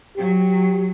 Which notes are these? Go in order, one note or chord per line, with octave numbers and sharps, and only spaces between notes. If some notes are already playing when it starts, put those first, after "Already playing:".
F#3 G4